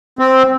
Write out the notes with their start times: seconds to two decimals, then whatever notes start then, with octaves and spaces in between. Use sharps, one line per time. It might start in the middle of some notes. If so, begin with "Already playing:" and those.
0.19 C4